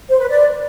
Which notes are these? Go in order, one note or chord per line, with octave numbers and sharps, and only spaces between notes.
C5
B4
D5